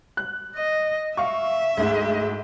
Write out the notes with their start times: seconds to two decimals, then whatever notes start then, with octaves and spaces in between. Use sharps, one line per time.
0.17 F#6
0.56 D#5
1.17 E5 F5 C#6
1.77 D2 G#2